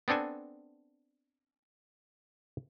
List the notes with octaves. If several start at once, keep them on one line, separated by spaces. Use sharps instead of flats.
B3 C4 D4 A4 G#5